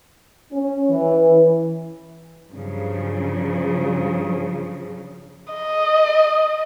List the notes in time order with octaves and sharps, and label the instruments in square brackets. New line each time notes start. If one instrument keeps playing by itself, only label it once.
[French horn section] C#4
E3
[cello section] G2 C#3 F3 F#3
[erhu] D#5